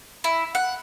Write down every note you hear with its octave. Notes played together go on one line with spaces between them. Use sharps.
E4
F#5